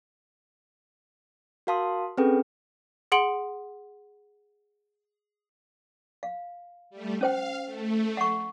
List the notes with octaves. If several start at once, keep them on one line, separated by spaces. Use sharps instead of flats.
F#4 A#4 F5 A5 C6 D#6
C4 C#4 G#4 A4 B4 G5
G#4 F#5 C6 D7 F#7
F5
G3 A3
C#4 C5 F5 G5
A3
F#5 C#6